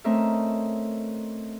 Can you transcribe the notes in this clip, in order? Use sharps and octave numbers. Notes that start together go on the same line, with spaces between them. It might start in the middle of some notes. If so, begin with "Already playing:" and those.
A3 C4 C#4 A#4 D#5 E5